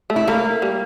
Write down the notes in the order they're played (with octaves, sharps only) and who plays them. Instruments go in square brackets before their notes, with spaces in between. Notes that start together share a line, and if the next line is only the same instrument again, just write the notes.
[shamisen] A3
[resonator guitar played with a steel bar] E4
[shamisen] A3 [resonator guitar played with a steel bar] A#3
[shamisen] G3